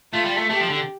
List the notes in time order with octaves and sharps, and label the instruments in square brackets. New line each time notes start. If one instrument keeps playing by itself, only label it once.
[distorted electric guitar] A3 [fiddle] F4
[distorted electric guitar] G3
A3
[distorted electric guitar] A3 [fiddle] G4
[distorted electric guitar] F3
D3